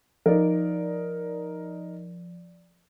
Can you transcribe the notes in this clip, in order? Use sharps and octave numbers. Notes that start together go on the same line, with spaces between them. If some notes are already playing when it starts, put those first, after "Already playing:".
F3 D#4 A#4 D5